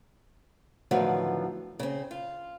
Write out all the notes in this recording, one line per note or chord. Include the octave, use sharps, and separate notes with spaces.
A2 D3 D#3 F3 F#3 B3
C#3 C4
F4